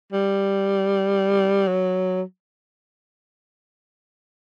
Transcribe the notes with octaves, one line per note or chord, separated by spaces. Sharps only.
G3
F#3